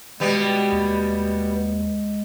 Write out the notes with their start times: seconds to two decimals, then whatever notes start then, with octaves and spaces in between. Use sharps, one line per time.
0.20 B2 G3 G#3 B3
0.72 D#2